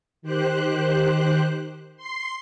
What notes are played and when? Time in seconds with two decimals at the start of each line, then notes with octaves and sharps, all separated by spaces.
0.22 D#3 G4 C5 F#6
1.97 C6 C7